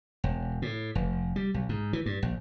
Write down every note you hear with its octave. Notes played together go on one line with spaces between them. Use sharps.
E1
A2
F1
G3
B1
G#2
E3
G2
A#1